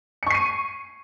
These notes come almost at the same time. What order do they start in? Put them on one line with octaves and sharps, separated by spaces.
C#7 C#6 C7 D#7